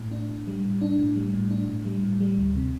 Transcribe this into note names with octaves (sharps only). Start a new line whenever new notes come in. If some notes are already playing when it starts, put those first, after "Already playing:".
Already playing: A2
D4
A2
G3
A2
D4
A2
G3
A2
D4
A2
G3
A2
G3
D2
C3